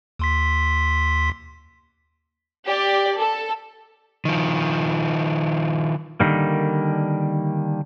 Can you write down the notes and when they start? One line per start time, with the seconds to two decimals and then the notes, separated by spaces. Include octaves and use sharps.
0.19 D#2 C6 B6
2.67 G4 D5
3.20 A4
4.25 D#3 F3
6.20 D3 D#3 G3 A#3